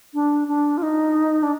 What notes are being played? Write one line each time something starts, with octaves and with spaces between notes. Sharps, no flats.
D4
D4
F4
D#4
D4